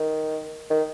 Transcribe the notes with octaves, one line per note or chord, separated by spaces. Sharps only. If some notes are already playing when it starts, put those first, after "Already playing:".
Already playing: D#3
D#3